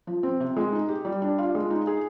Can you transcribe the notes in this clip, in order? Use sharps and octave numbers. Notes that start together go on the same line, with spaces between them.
F3
C4
C3
G#3
D#4
G4
G3
D4
F4
G#3
D#4
G#4